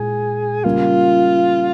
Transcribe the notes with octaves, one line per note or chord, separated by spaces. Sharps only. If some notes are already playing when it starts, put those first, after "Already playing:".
Already playing: A#2 G#3 E4 G#4
C#3 G3 A#3 F4